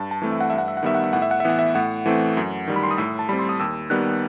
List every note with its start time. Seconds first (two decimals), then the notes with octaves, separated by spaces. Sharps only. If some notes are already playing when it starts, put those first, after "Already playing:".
Already playing: G2 A5
0.11 A5
0.22 E3 A3 C4
0.31 E5
0.40 F#5
0.50 G2 E5
0.58 F#5
0.68 E5
0.77 F#5
0.83 D#3 G3 B3 E5
0.94 F#5
1.04 E5
1.13 A2 F#5
1.22 E5
1.31 F#5
1.40 E5
1.45 E3 B3 F#5
1.59 E5
1.75 A2 F#5
2.06 E3 A3 C4
2.37 F#2
2.67 D#3 G3
2.76 B5
2.83 C6
2.91 D#6
2.98 A2 E6
3.19 A5
3.29 G3 C4 B5
3.39 C6
3.49 D#6
3.60 D#2 E6
3.90 D#3 G3 B3 F#6